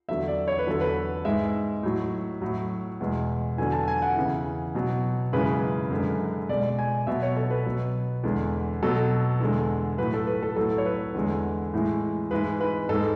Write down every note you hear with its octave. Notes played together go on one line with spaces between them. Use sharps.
E2 D3 F#3 E5
D5
C#5
B4
E2 D3 F#3 A4
B4
G#2 G#3 E5
A2 F#3
A2 F#3
E2 B2 G#3
E2 D3 F#3 G#5
A5
G#5
F#5
E2 C#3 E3
B2 F#3
F#2 C#3 E3 G#3 B4
F#2 D3 G#3
B2 G#3 D5
G#5
B2 F#3 E5
C#5
A4
B4
B2 F#3
E2 D3 G#3
B2 F#3 A4
E2 D3 G#3
A2 F#3 B4
A4
B4
A4
A2 F#3 A4
C#5
B4
E2 D3 G#3
A2 E3 G#3
G#2 E3 G#3 B4
B4
G#2 G#3 A4